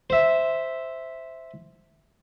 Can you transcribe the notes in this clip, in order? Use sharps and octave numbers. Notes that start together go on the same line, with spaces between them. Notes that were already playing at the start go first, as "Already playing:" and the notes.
C5 E5